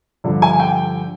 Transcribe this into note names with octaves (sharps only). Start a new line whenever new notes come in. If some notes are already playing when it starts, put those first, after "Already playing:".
G2 D3 F3
G#5
G5